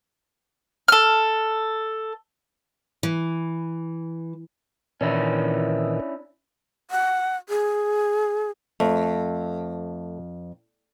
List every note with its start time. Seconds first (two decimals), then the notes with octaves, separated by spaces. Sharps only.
0.88 A4 F6
3.03 E3
5.01 A#2 D#3 E3 C#4 D4 E4
6.91 F#5
7.49 G#4
8.80 F2 A3